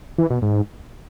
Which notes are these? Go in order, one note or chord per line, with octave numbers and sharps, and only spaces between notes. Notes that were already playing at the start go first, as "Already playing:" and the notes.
E3
B2
G#2